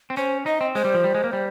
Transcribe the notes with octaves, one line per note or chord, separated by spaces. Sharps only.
C4
C#4 C5
D#4 D#5
C4
G#3 C5
G3
F3
G3
G#3
A#3
G3